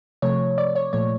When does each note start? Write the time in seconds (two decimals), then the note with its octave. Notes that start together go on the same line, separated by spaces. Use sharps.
0.22 C3 F3 A3 C#5
0.58 D5
0.75 C#5
0.93 A#2 F3 A3 C#5